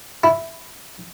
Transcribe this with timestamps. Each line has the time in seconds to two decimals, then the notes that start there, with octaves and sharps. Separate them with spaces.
0.24 E4